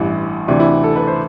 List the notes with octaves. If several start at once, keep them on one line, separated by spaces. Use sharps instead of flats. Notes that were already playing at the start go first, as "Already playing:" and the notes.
Already playing: A1 G2 E3 E4
D2 C3 E3 D4
E4
A4
B4
C5